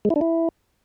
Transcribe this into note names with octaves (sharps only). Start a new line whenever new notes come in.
G#3
E4
D4
E4